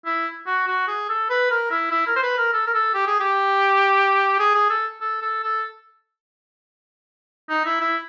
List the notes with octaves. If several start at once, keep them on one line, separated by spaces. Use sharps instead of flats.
E4
F#4
F#4
G#4
A4
B4
A#4
E4
E4
A#4
C5
B4
A#4
A4
A#4
A4
G4
G#4
G4
G#4
G#4
A4
A4
A4
A4
D#4
E4
E4